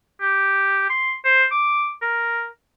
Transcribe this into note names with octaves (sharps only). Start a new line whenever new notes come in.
G4
C6
C5
D6
A#4